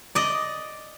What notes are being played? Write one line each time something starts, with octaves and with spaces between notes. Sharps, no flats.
D5 D#5